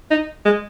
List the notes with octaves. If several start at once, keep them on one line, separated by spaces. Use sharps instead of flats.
D#4
G#3